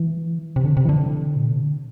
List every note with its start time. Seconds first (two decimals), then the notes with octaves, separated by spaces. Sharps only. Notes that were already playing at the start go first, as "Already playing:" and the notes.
Already playing: E3
0.56 C3
0.65 D3
0.77 C3
0.85 E3
0.89 D3
1.37 A#2
1.50 C3
1.63 D3